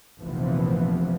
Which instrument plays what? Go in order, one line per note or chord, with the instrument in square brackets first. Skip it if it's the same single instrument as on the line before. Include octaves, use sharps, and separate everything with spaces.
[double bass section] F1 A#1 C3 E3 F3 B3